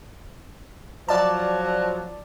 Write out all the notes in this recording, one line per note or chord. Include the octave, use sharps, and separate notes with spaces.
F3 F#3 D5 A5